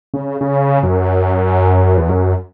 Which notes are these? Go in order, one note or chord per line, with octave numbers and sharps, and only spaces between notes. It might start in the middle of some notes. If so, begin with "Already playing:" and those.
C#3
C#3
F#2
E2
F#2